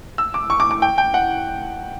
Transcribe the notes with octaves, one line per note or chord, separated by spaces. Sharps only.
E6
D6
C#6
D6
D6
G5
G5
F#5